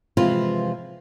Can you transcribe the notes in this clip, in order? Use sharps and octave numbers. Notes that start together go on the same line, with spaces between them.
C3 E3 F3 G#3 F4 B4